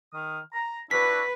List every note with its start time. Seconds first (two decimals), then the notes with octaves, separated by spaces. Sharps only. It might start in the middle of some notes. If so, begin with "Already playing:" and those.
0.13 D#3 D#6 F6
0.53 A#5
0.91 D4 E4 F#4 B4 B6